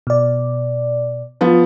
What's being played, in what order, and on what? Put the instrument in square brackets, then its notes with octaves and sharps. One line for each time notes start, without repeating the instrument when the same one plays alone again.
[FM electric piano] B2 D5
[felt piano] F3 B3